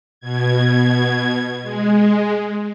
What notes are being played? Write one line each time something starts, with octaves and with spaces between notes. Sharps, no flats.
B2 G#6
G#3